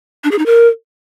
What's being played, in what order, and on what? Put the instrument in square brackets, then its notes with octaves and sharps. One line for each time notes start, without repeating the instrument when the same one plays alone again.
[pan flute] D4
G#4
D#4
A#4